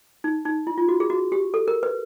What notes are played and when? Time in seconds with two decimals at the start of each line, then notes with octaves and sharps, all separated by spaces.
0.24 D#4
0.45 D#4
0.67 E4
0.78 F4
0.89 F#4
1.00 G#4
1.10 F#4
1.32 G4
1.54 A4
1.68 A#4
1.83 B4